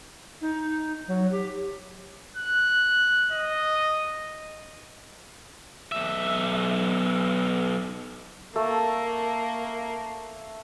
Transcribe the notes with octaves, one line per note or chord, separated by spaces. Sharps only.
D#4
F#3
G4
F#6
D#5
B1 E5
A3 A#3